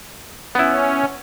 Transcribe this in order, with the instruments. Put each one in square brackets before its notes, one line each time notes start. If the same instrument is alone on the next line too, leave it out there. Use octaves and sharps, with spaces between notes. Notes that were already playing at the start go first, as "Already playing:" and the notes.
[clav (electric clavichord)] B3 E4 [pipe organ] C#4